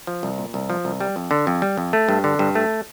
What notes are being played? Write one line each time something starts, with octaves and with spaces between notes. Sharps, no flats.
F3
C2
A#2
C2
F3
C2
G3
F2
D3
F2
G3
F2
A3
G2
D3
G2
A3